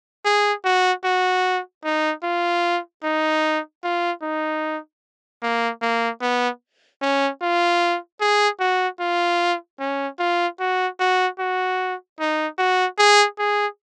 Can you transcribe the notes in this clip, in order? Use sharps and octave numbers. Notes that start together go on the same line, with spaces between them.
G#4
F#4
F#4
D#4
F4
D#4
F4
D#4
A#3
A#3
B3
C#4
F4
G#4
F#4
F4
C#4
F4
F#4
F#4
F#4
D#4
F#4
G#4
G#4